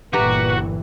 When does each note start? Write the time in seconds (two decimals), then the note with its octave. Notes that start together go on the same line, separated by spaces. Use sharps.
0.13 G1 A#2 E3 F#4 G4 B4 A#5